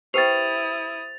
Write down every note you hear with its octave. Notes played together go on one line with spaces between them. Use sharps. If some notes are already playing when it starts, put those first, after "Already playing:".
E4 G4 B4 C5 G5 D#6 A6 F7